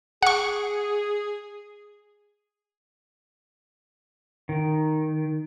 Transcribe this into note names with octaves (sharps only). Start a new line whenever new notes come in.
G#4 F#5 C#6
D#3